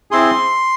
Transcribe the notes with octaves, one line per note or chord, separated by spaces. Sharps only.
C4 E4 G#4 C6